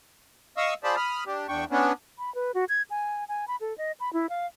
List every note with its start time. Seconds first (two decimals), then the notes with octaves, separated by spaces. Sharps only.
0.57 D#5 F5 C#6 D#6 E6
0.84 F4 G#4 C5 D5 A5 B5
0.96 B5 D#6 F6
1.27 D4 G4
1.49 E2 D4 G5 C#6
1.71 B3 C#4 D4
2.18 B5
2.35 B4
2.54 F#4
2.69 G#6
2.90 G#5
3.28 G#5
3.48 B5
3.61 A4
3.78 D#5
4.00 B5
4.13 E4
4.29 F5